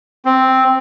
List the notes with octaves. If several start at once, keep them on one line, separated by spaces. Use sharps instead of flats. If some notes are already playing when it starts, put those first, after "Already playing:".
C4